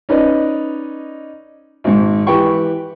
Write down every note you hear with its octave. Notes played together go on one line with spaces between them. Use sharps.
C#4 D#4 B4 D5 D#5
G#1 G#2
E3 G4 B4 G5 C#6